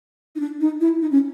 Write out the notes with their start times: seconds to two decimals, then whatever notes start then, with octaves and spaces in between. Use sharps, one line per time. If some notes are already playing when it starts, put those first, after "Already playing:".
0.36 D#4
0.40 D4
0.61 D#4
0.81 E4
1.02 D#4
1.11 C#4